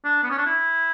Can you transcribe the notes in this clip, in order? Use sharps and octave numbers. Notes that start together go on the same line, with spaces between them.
D4
B3
C#4
D4
E4